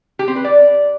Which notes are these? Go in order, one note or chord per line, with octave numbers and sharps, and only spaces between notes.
G4
C4
B4
D5